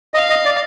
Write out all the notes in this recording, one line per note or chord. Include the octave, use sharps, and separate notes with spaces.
D#5 F5
D#5
D5